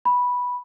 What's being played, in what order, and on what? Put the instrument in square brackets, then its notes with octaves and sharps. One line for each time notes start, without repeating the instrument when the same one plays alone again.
[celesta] B5